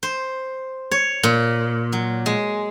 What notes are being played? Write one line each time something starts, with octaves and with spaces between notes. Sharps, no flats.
C5
C#5
A#2
F#3
G#3